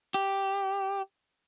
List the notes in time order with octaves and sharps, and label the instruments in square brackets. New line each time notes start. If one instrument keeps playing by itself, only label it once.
[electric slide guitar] G4